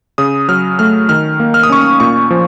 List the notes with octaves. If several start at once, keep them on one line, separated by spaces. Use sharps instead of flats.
C#3 D#6
F#3 F6
A3 F6
D#3 F6
A#3
F6
D#6
C#4 C#6
D#6
A#2 C#6
F3